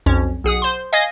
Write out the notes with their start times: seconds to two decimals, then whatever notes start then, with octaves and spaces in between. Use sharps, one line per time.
0.06 B1 F2 C#4
0.44 B1 G#4 F#5 D#6
0.62 C5 C6
0.93 D#5 F5 G#5 D#6 G#6 A#6